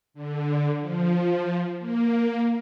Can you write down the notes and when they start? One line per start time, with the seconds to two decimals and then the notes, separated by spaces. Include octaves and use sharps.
0.14 D3
0.80 F3
1.79 A#3